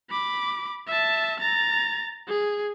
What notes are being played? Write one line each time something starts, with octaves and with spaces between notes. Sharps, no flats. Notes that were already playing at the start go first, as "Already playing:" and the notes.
B5 D6
E5 A5
A#5 A6
G#4